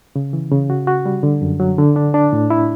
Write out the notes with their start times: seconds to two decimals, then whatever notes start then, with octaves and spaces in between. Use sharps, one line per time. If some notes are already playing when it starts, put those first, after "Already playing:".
0.16 C#3
0.33 E3
0.52 C#3
0.70 F#4
0.87 F#4
1.06 G3
1.23 D3
1.42 F#2
1.60 F#3
1.78 D3
1.96 D4
2.14 D4
2.33 A2
2.50 E4